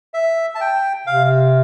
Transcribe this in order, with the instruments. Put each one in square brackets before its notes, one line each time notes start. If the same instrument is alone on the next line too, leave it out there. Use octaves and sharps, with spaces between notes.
[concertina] E5
A5
G5
[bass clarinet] C3 [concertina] F5